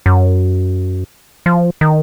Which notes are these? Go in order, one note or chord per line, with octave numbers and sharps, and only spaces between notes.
F#2
F3
D#3